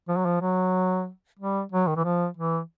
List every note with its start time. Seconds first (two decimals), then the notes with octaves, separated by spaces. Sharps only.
0.08 F3
0.17 F#3
0.25 F3
0.41 F#3
1.39 G3
1.72 F#3
1.87 D#3
1.96 E3
2.04 F3
2.37 E3